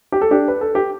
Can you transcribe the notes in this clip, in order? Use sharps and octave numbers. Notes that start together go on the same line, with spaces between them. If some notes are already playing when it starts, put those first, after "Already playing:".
G4
A4
D4 G4
B4
A4
G4